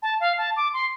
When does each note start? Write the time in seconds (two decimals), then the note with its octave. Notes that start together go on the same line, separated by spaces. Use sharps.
0.02 A5
0.20 F5
0.38 A5
0.56 D6
0.73 C6